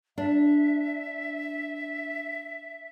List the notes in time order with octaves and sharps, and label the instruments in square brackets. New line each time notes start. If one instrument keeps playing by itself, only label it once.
[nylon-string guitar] D4 [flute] E5